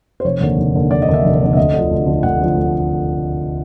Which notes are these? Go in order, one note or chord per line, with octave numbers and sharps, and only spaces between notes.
C5
F1 C#5
D#2 D3
F1
D#2 D3
F1 D5
D#5
D#2 D3
E5
F1
D#2 D3
E5
D2 D#5
D3 F3
D2
D3 F3
D2 F#5
D3 F3
D2